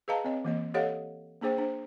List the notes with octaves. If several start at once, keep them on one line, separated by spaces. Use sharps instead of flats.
G#4 B4 D#5 F5 A5 A#5
C4 C#5 D#5
E3 A#3 D#5
G4 A4 C#5 D#5 F5 F#5
A#3 D4 G#4 C5 G5
D4 C5